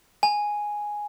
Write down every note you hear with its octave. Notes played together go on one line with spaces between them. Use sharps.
G#5